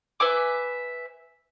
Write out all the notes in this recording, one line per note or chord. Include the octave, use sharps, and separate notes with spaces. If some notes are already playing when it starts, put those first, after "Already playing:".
B4 E5 G#5 D6